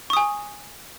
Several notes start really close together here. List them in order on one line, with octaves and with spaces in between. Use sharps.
C#6 D#6 G#5